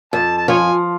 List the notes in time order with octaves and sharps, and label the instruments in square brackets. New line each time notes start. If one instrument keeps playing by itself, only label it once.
[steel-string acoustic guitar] F2 [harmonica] A5
[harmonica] A5
[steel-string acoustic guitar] F3 [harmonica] C#5 G#5